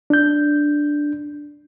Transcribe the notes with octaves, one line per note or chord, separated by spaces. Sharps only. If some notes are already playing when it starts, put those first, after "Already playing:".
D4 G6